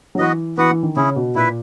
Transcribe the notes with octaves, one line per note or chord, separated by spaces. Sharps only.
F#3
E3 B3 F#4 B4 D#5
E3 B3 F#4 B4 F#5
E3
D#3
C#3 C#4 E4 G#4
B2
A#2 E4 B4 E5